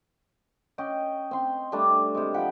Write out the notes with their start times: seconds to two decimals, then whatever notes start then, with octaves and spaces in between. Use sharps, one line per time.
0.78 C#4 D#5 G5
1.31 C4 C6
1.72 G3 A3 D4
2.15 C3 G#3
2.34 F3 F#5 G5 B5